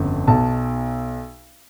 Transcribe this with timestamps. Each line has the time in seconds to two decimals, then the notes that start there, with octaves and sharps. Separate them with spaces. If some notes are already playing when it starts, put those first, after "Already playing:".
Already playing: G1 F2 C#3
0.27 B1 B2 A5